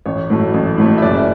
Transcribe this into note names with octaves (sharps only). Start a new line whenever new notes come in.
A1 C#5
A2 F#3 A3
A1
A2 F#3 A3
E5
F#1 D5